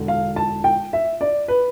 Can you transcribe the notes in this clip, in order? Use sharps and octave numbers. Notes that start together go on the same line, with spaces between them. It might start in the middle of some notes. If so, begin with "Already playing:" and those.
Already playing: E1 D3
F5
A5
G5
E5
D5
B4